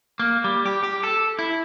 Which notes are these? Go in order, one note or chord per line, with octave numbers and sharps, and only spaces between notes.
A#3
G3
G4
G4
A4
E4